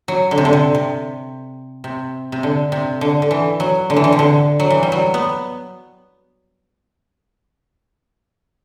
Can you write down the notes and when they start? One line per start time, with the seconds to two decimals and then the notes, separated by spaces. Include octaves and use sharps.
0.08 F#3
0.31 D3
0.38 C3
0.45 D3
0.53 C3
0.75 C3
1.84 C3
2.32 C3
2.43 D3
2.72 C3
3.01 D3
3.22 D3
3.31 E3
3.60 F#3
3.90 D3
3.96 E3
4.04 D3
4.12 C3
4.19 D3
4.60 F#3
4.70 E3
4.83 G3
4.92 F#3
5.14 B3